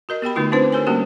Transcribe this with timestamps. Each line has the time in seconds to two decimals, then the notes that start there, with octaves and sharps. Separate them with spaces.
0.09 F#4 A#4 D#5
0.22 B3 G4 G5 B5
0.36 D3 A3 D#4 F4 F#4
0.52 C4 D4 F4 B4 C5
0.72 G4 A#4 C#5 G#5
0.87 G3 A#3 C#4 F#4 G4